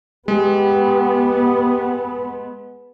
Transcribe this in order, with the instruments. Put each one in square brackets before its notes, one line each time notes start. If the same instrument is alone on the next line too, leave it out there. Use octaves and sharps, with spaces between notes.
[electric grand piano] G#3 [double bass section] B3 [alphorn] G4